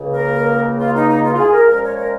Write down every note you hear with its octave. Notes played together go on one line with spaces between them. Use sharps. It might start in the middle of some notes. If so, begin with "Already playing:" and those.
Already playing: C#2 C#3 A#3
A#4
F4
D#4
D#4
F4
F4
G#4
A#4
A#2 F3 G#3 C#4 A#4
C#5
A#4